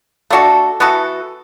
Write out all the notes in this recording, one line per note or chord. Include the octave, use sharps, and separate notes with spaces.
A3 D4 F#4 A4
E3 B3 F#4 A4